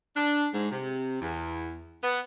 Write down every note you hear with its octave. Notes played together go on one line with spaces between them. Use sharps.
D4
G#2
C3
E2
B3